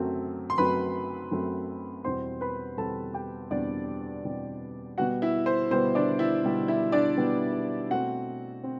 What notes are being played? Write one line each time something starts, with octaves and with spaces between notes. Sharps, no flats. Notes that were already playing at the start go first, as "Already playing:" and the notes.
Already playing: F#2 F#3 A3 C4
C6
F#2 F#3 A3 C4 B4 B5
F#2 F#3 A3 C4
E2 B2 G3 C4 C5 C6
B4 B5
E2 B2 G3 C4 A4 A5
G4 G5
E2 B2 G3 C4 D4 D5
E2 B2 G3 C4
B2 G3 B3 F#4 F#5
E4 E5
C5
B2 G3 B3 C5
D4 D5
E4 E5
B2 G3 B3
E4 E5
D4 D5
B2 G3 B3
B2 A3 C4 F#4 F#5
C4